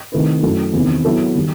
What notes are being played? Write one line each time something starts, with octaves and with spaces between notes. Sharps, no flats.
C3 D#3 A3 E4 B4
F#2 F#3 A3 E4
E2 C3 D#3
F#3 B3 E4 A4
D#3 G3